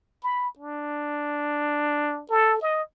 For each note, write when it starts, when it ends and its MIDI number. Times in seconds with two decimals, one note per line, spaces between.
0.23 0.48 83
0.58 2.23 62
2.30 2.59 69
2.62 2.82 75